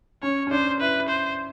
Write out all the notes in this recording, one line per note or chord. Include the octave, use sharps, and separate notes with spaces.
C#4 C#5
C#4
D4 C5
E4 B4
C5